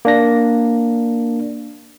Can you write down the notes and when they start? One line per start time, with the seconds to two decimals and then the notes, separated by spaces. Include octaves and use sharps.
0.05 A#3 D4 A#6